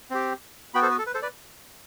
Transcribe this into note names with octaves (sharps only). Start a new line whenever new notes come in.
C4 G4
B3 F#4 G5 B5
A4 C5
B4
A4
B4
A4 C5
B4 D5